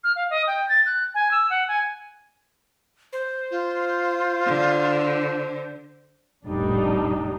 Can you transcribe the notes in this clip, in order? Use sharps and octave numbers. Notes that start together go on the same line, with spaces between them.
F6
F5
D#5
G5
A6
F#6
G#5
E6
F#5
G#5
C5
F4
D3
F1 A#1 A2 G3 D4 D#4